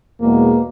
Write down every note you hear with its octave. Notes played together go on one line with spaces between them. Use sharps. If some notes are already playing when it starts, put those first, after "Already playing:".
E2 B2 G#3 A#3